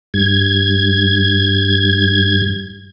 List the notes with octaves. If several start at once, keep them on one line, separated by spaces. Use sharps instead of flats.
G2 G#6